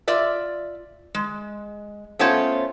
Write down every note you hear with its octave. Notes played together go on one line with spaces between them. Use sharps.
F4 D5 E5
G#3
A3 B3 C#4 F4 C5 C#5